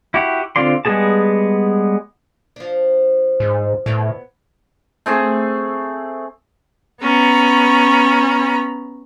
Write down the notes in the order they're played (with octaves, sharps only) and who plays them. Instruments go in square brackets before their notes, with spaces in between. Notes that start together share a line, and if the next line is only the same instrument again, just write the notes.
[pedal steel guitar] E4 F#4 G4
D3 C4 F4 D5 C6
G3 G#3 B3 G#4 A5
[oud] F3 D4
[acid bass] G#2
[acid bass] A2 [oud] B3 C#5 D5
[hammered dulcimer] A3 C4 G#4
[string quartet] B3 C#4 A#5 B5